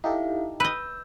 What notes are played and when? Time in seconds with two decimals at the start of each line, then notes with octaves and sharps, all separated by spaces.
0.04 D#4 E4 G4 A4 E5 F5
0.60 B4 D#5 E6 G6